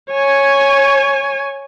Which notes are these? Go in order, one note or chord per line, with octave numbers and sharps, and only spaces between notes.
C#5 G#5